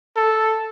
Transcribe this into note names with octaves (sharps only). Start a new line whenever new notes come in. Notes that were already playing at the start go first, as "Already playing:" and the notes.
A4